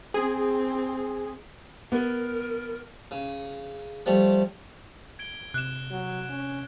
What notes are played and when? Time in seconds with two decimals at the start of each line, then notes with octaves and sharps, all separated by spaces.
0.14 C4 G#4
1.92 B3 A#4
3.11 C#3
4.06 F3 G3 A3 C#5
5.19 G#6 D7 G7
5.54 C3 F#6 E7
5.91 F#3
6.30 C#4